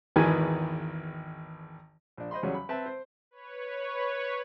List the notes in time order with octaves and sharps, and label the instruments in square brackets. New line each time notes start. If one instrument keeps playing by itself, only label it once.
[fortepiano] G#1 E2 D#3 E3 B4 G#5
A#1 D4
C5 D#5 B5 C6
E2 C#3 F#3 G3 C#4 C#5
B5
C4 B4 E5 A5
C5
[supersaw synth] B4 C#5